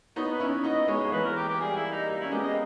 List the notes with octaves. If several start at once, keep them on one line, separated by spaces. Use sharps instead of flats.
B3 D#4 C#5
B4
C#4 E4
C#5
B3 D#4 D#5
G#3 B3 C#5
A#3
E3 G#3 B4
A#4
G4
G4
G3 A#3 G#4
E4
D#4
G3 A#3 D#4
C#4 E4
G#3 B3 G4
D#5
A#3